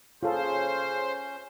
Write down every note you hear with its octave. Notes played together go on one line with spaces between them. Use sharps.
C#3 C#4 F4 G#4 A4 C5